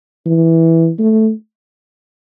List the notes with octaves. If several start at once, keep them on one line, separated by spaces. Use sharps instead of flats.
E3
A3